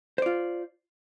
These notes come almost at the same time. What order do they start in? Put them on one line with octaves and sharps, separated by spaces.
C5 D5 F4